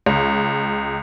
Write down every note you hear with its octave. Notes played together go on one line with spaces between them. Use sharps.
C#2